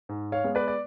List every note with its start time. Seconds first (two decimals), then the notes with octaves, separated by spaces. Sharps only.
0.09 G#2
0.32 C#5 F5
0.44 G#3 B3
0.55 B4 D5
0.68 D5